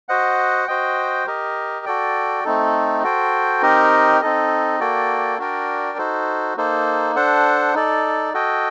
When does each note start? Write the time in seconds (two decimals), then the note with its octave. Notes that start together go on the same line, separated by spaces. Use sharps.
0.09 F#4 C5 D#5 F#5
0.67 F#4 C5 D#5 G5
1.26 G4 A#4 D#5
1.86 F#4 A4 D5 G5
2.44 A3 C4 D#4 A4
3.03 F#4 A4 C5 G5
3.62 C4 D#4 G4 A#4 D#5
4.21 C4 D#4 A4 D#5
4.80 A#3 F#4 A4 D5 G5
5.39 D4 F#4 A#4 D5 G5
5.98 D#4 F#4 A4 C5
6.57 A#3 D#4 A4 C5
7.16 D4 A4 C5 F#5
7.74 D#4 A4 D5
8.34 F#4 A4 D#5 G5